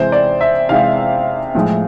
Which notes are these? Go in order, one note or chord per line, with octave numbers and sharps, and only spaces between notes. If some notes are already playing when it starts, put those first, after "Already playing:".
Already playing: C3 E3 G#3 C5
D5
E5
C3 E3 G#3 F5
A2 F3 G#3